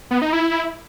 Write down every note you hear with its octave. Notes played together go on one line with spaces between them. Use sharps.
B3
D#4
E4